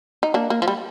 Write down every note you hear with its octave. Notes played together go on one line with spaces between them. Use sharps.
D#4
A#3 D4
A#3
F3
G3